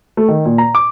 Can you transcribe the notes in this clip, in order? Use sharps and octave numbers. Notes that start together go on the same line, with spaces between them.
A3
D#3
A#2
A#5
D6